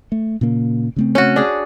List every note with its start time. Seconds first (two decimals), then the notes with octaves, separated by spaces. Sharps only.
0.12 A3
0.41 A#2 C#3 A#3
0.96 C#3 A3 C4
1.15 C#4 F#4
1.36 D4 G#4